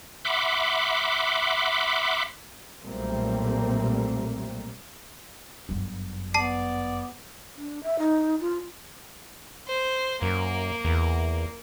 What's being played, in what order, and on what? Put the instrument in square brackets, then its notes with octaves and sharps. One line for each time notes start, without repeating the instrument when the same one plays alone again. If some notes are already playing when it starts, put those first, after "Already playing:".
[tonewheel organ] E5 F#5 B5 C6 D6
[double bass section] B1 A#2 G3 A3 A#3 C4
[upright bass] G1 F#2
[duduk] B3 [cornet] D5 [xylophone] A5 C7
[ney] D4
E5
D#4
F4
[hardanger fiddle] C5
[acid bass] F#2 [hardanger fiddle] A#3
[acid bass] E2